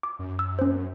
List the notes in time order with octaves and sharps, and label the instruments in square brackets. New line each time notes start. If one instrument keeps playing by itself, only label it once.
[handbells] D6
[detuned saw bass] F#2
[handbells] E6
C#4 C5